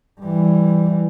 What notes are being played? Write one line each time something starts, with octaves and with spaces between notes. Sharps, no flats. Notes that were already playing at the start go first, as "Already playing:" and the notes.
E3 G3